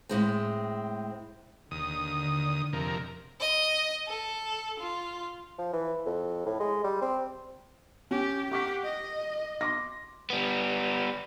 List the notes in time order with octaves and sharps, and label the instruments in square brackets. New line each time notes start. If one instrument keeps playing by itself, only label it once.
[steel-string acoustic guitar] A2 G#3 C4
[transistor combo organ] D#2 D#6 [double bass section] D3
[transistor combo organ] F2 C3 A#4
[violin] D#5
A4
F4
[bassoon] F3
E3
F2
A2
G#3
G3
C4
[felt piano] C#4 [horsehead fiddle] G4
[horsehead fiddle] G4 F#5 [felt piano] C#6 D6 B6
[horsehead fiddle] D#5
[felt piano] C6 D6 A#6
[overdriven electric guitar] G3 B3